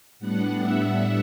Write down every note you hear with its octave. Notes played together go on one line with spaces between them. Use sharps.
A2 G3 B3 D4 F#5
E5